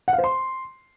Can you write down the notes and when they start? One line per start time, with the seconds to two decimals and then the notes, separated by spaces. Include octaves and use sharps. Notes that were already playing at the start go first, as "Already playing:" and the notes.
0.08 F#5
0.13 F5
0.18 C5
0.24 C6